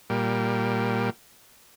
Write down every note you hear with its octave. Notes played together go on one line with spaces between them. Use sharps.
A#2 G3